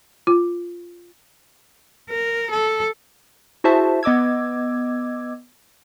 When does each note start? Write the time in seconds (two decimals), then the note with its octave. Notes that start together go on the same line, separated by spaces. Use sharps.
0.27 F4
2.10 A#4
2.51 A4
3.64 E4 F#4 G#4 C5 E5 A5
4.03 B3 D#5 D6 E6 G#6